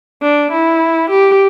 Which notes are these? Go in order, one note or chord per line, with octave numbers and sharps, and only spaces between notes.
D4
E4
G4